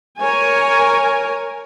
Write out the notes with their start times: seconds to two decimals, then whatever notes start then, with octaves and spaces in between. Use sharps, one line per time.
0.20 A#4 C#5 G#5